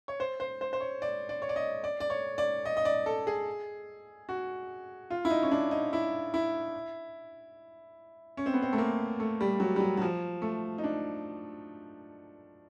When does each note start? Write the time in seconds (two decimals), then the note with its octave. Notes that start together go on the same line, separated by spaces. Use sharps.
0.08 C#5
0.20 C5
0.40 C5
0.61 C5
0.73 C5
0.80 C#5
1.02 D5
1.29 D5
1.42 C#5
1.49 D5
1.56 D#5
1.84 D5
2.00 D5
2.10 C#5
2.38 D5
2.65 D#5
2.77 D#5
2.85 D5
3.06 A4
3.27 G#4
4.29 F#4
5.10 F4
5.25 E4
5.30 D#4
5.43 C#4
5.51 D4
5.71 D#4
5.93 E4
6.34 E4
8.37 C#4
8.46 C4
8.54 B3
8.62 C4
8.73 A3
8.78 A#3
9.20 A3
9.41 G3
9.60 F#3
9.76 G3
9.80 F#3
9.97 F#3
10.02 F3
10.42 A3
10.78 D#4
10.84 D4